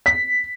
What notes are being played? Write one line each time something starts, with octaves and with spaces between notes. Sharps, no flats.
B6